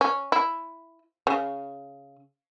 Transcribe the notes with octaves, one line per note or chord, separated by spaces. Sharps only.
C#4
E4
C#3